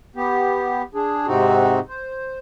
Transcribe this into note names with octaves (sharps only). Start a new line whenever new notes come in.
B3 G4
D4 G#4
G#2 C3 C4 D#4 F#4
C5